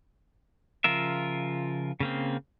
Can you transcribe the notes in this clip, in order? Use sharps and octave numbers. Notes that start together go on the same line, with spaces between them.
C#3 F3 F4 A#4 E5
C#3 A#3 C4